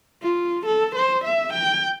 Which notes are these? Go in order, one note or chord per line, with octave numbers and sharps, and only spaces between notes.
F4
A4
C5
E5
G5